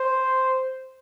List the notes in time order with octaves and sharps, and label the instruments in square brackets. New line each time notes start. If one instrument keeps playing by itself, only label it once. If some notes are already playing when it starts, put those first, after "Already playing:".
Already playing: [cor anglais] C5